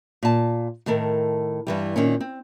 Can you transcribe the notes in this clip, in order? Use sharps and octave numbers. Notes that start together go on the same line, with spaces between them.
A#2 A5
A2 D#3 A4 A#4
G2 E3 G3
A#2 D#3 C4 C#4
C4